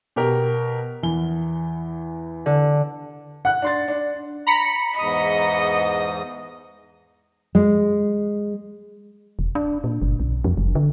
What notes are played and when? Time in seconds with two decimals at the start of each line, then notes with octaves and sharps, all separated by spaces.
0.16 B2 G4 A#4
1.03 E2 E3 G7
2.46 D3
3.45 F#5 F#6
3.62 D4 C6 A6
3.88 D4
4.47 A#5 B5 C#7
4.99 E2 G#2 D#5 D#6
7.55 G#3
9.39 E1
9.55 D4
9.84 A#2
10.02 G1
10.20 B1
10.44 F2
10.57 F#1
10.75 D3